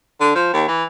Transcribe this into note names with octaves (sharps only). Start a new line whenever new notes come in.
D3
F3
D#2
E3